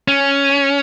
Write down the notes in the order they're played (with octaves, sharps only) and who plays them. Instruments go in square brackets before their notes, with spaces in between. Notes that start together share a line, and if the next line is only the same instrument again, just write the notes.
[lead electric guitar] C#4